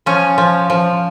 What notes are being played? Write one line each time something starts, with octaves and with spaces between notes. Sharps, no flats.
F3 C#4
F3
F3